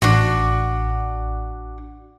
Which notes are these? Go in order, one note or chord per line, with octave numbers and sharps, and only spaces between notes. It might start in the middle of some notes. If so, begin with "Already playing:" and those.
A1 D4 F#4